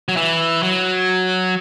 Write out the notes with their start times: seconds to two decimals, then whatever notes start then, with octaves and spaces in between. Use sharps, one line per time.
0.09 F#3
0.17 E3
0.63 F#3